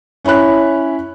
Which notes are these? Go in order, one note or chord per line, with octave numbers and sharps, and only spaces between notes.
C#4 E4 C#5 B5 F#6